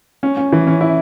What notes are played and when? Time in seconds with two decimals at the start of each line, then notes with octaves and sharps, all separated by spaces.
0.23 C#4
0.37 C#4
0.52 E3
0.67 C#4
0.81 E4